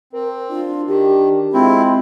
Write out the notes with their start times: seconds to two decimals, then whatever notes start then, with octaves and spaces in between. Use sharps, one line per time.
0.13 C4 A#4
0.50 D4 F4
0.88 D#3 G4
1.54 G#3 C4 E4 F4